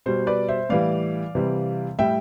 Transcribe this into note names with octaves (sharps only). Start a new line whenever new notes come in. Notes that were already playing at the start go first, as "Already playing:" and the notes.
B2 G3 C5
B4 D5
C5 E5
A2 E3 G3 D5 F5
C3 E3 G3
A2 G3 E5 G5